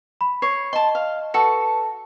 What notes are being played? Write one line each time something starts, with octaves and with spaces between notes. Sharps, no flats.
B5
C#5 C7
D#5 A5 C6
F5
F#4 A4 B4 C#6 C#7